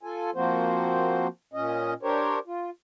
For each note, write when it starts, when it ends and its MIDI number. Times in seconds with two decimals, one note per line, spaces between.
0.03 0.30 65
0.03 0.30 69
0.03 0.30 80
0.35 1.27 53
0.35 1.27 58
0.35 1.27 60
0.35 1.27 66
0.35 1.27 72
1.54 1.94 46
1.54 1.94 61
1.54 1.94 75
2.03 2.39 62
2.03 2.39 67
2.03 2.39 70
2.03 2.39 72
2.03 2.39 73
2.47 2.70 65